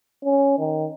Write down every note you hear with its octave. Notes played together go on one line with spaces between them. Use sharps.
C#4
D#3